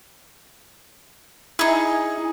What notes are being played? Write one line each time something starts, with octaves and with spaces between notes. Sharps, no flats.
D#4 E4 G#4